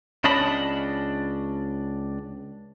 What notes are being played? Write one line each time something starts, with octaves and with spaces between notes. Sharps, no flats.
C#2 C#4 D4 D#5 A5 B5